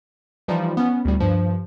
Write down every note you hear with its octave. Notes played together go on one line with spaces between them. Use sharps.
E3 F3 G3 D#4 F4
B3 C#4
D2 A2 G3
G2 F3